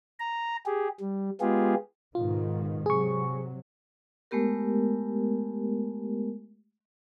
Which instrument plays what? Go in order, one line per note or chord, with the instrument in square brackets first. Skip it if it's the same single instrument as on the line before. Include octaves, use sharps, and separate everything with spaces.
[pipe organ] A#5
G4 G#4
G3
G#3 B3 F4 G4 G#4
[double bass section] G#2 B2 D#3 [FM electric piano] F4
[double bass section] C3 F#3 [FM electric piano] G#4 C#6
[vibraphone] G#3 A3 B3 G4 A#4